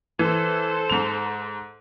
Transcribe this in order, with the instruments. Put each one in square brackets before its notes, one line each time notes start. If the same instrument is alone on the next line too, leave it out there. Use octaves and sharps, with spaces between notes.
[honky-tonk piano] E3 [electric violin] A4 C5
[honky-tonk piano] G#2 F7